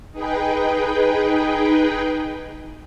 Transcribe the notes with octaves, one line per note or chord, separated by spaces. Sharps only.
D#4 G#4 B4 G5